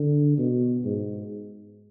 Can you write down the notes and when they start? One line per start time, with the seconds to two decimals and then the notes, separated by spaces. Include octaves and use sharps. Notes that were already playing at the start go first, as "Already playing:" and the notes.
Already playing: D3
0.38 B2
0.84 G#2